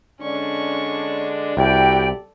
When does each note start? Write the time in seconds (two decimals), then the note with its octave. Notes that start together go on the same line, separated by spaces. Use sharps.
0.21 D3 G#3 C#4 D4 C#6
1.57 C2 E4 F#4 G4 A4 D5 G5